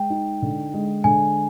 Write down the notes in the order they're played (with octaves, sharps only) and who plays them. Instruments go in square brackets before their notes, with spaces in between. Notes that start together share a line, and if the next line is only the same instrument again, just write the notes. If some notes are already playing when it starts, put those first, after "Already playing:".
Already playing: [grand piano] G#3 [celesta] G5
[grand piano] D#4
D3
G#3
[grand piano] D3 [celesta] G#5